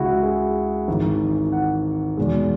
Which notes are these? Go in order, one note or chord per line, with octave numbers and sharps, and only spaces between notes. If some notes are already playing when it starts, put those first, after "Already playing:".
Already playing: C#2 C#3 G#3 E4 F#4
G#4
G#1 G#2 E3
F#5
E2 B2 G#3